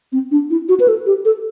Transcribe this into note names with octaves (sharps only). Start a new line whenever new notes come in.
C4
D4
E4
F#4
B4
A4
G4
A4